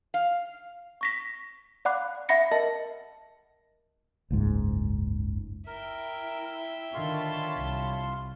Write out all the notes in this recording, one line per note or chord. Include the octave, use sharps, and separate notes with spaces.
F5
C#6 A#6 B6
D5 F5 F#5 B5 D6 F#6
E5 F#5 B5 A#6 C#7
A#4 D#5 A5
F#1 C#2 G#2
E4 A#4 E5 G5
D3 D#3 F4 C#5 A5 B5 C6
C2